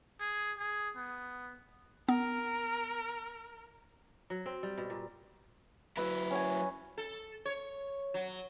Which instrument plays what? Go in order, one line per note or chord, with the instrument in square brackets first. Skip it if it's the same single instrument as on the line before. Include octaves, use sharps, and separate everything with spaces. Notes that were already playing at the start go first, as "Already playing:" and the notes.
[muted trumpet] G#4
G#4
B3
[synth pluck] B3 [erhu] A#4
[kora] F#3
C4
G3
B2
A#2
[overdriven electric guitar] F#3 E4 [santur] B4 E5
[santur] C#4 G#5
[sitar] A4
C#5
F#3